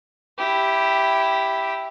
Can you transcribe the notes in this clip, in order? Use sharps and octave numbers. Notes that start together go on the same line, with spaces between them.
E4 G4